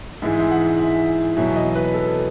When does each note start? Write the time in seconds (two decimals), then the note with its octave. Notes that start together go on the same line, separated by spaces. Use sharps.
0.22 G#2 E3 G#3 E5
0.40 E5
0.51 F#5
0.80 E5
1.37 E2 B2 F#3 E5
1.56 D#5
1.75 B4
1.94 A4